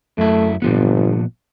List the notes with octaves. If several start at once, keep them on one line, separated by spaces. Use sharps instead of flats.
F#2 A3 E4
G1 A#2 F3 B3